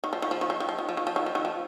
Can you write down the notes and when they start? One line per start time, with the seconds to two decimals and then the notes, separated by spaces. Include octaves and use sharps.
0.04 D#3
0.13 F3
0.22 D#3
0.31 F3
0.41 D#3
0.50 F3
0.60 D#3
0.69 F3
0.78 D#3
0.89 F3
0.97 D#3
1.07 F3
1.16 D#3
1.26 F3
1.35 D#3
1.45 F3